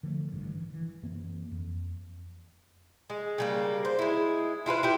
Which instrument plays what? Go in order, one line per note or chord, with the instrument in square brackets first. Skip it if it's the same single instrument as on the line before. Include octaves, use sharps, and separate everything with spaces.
[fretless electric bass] D3 F3 G3 A3
A1 G2
E3
E3
F#2 E3 A#3 C4
F2
[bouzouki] G#3
C#3 G3 A#3
C5
G#3 E4
E4 F4 G#4 B4
E4 G4